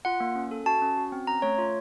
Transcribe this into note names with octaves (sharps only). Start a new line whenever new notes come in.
F4 F#5
A#3
C#4
A4
F#4 A5
C#4
F#4
C4
C#4 A#5
A3 C#5
F4